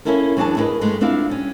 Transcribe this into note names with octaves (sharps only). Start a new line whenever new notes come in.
A#3 C4 C#4 E4 A4 A#4
E2 F#3 D4 F#4 G#4 A5
E4 G#4 A#4 B4 D#5
G2 G#3 A3 B4
B3 C4 D4 E4 F4 F5
G3 C#4